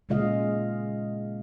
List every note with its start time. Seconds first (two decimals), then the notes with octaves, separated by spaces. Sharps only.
0.09 A#2 C#3 G#3 F4 D#5 F5